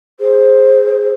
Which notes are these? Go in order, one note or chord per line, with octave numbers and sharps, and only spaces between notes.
G#4 C5